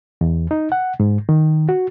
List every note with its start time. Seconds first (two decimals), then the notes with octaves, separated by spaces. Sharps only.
0.21 E2
0.51 D#4
0.72 F#5
1.00 G#2
1.29 D#3
1.69 F#4